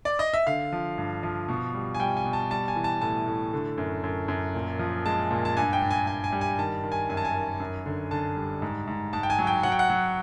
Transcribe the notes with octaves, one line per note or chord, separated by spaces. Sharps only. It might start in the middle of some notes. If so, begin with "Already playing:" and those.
D5
D#5
E5
D3 F5
F3
G2
F3
B2
G3
G#5
G3 G5
G#5
B2
A5
G3 A5
G#5
E3
A5
A2 A5
A2
D3
F#2
F#2
F#2
A#2
F3
G#3 A5
A#2
A5
G2 G#5
G5
G2
G#5
G2 G#5
G#5
G3
G#5
D#3 A5
D#3
G#5
F#2 G#5
A5
G#5
D#3
F#2
D3
D3 A5
G3
G#2
G#2
G#2 A5
G5
G#5
F#3
G5
F#3 F#5
G5
F#5
F#3